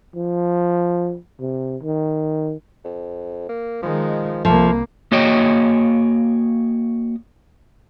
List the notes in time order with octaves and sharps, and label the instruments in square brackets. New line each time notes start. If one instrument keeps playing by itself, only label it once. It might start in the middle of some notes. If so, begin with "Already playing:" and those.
[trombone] F3
C3
D#3
[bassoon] F2
A#3
[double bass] D#3 G#3 [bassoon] F3
[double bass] C2 A#3 [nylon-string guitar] F3 [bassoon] A3
[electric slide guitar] A#3 F#4 C#5 D#5 G5